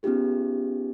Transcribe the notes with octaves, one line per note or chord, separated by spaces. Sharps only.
B3 C#4 D#4 F4 G4 G#4